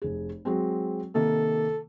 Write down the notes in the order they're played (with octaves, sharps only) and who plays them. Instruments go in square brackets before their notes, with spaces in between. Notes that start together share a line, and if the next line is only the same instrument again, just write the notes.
[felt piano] F1 G#4
F#3 G#3 C4
[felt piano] C3 D#3 A#3 [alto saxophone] A4